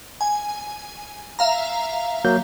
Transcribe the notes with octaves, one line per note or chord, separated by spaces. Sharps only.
G#5
E5 F5 A#5
F#3 A#3 G6